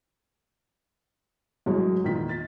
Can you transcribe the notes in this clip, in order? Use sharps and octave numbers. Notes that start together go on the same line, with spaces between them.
A1 F#2 F#3 G#3 C#5
E2 A#2 D#3 B6
A6 B6